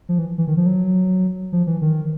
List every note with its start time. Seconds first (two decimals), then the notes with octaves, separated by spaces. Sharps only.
0.09 F3
0.18 E3
0.38 E3
0.48 D#3
0.57 F3
0.66 F#3
1.52 F3
1.67 E3
1.82 D#3